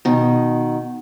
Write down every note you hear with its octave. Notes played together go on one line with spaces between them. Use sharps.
B2 D#3